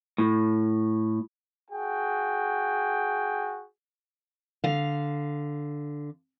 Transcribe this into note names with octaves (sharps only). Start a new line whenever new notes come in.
A2
F#4 G#4 G5
D3 F5